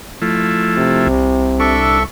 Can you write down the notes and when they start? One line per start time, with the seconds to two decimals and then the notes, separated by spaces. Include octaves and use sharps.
0.22 F3 A3 E4
0.78 C3
1.07 C2
1.60 D4 A4 E5 C#6